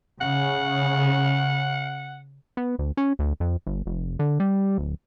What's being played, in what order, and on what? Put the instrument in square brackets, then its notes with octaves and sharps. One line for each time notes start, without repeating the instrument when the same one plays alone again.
[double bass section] C#3 [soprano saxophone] F#5
[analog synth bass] B3
D2
C#4
D2
F2
G1
F1
D3
G3
D1